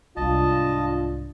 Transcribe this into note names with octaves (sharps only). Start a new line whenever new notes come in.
C2 G#2 D4 F4 D#5 A5